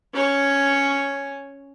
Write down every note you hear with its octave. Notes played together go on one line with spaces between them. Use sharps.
C#4 C#5